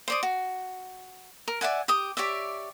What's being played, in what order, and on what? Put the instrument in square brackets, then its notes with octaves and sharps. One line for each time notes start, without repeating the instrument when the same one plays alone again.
[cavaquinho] C5 D5 D#6
F#4
A#4
D5 E5 F#5 G#5
G4 D#6
G4 C#5 D5 E5